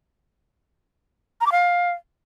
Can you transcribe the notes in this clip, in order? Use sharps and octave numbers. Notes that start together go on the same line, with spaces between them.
A#5
D6
F5